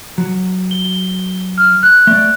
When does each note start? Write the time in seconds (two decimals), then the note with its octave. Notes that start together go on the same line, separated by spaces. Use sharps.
0.18 F#3
0.71 G7
1.58 F6
1.83 F#6
2.07 A3 D5